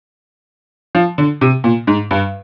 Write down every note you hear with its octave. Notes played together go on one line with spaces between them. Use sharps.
F3
D3
C3
A#2
G#2
G2